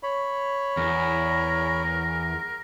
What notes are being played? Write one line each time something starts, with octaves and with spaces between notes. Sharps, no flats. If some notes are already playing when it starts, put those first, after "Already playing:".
C#5 B5
E2 A#4